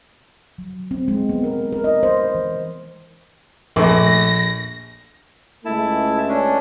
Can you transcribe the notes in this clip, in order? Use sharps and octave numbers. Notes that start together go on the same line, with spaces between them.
F#3
C4
G#3
B3
A#4
A#4
D#5
C5
E3
A#1 A3 A#6
C#2 G#3 A3 E4 A5
C#4 D4